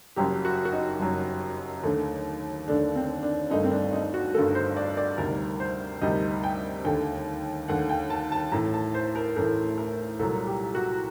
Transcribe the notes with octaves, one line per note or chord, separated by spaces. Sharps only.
F#1 F#2 F#3 G4
F#4
F#4
D#4
F#1 F#2 F#3
D#2 D3 A3
D#2 D3 A3 D4
C4
D4
G1 G2 D#3 A3 D#4
C4
D4
D#4
F#4
G1 G2 D#3 A3 A4
C5
D5
D5
D2 C3 D#3 G3 A#4
C5
D2 C3 D#3 G3 D#5
G5
D#2 D3 A3 G5
D#2 D3 A3 F#5
G5
A5
A5
A1 A2 A3 A#5
A5
C5
A#4
A1 A2 A3 A#4
A#4
C2 A#2 F#3 A4
G4
F#4